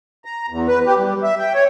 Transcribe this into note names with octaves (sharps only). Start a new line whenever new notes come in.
A#5
E2
B4
G4
G3
E5
G5
C#5